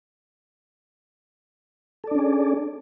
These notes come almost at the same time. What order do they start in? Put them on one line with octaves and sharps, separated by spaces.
A4 D5 D4 C#4 G#4